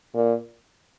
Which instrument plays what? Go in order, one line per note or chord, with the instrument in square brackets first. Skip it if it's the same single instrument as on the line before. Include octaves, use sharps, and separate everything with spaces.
[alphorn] A#2